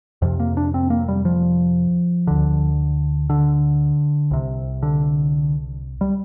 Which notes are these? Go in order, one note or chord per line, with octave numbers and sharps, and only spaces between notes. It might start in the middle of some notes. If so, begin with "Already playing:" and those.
F2 C3 F3
A#3
D4
C4
A#3
G3
F3
D2 D3
D3
C2 C3
D3
G3